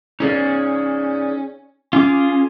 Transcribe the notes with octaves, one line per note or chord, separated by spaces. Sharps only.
C#4 D#4 G#4 D5
C#4 F4 G#4 D6